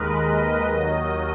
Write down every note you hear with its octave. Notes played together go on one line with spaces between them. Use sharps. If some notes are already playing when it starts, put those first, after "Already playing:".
Already playing: D#2 D#3 G#3 A#4 B4 D#5
D#5
D#2 D#3 F#3 D#5